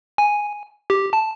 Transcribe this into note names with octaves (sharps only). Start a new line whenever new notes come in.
G#5
G4
A5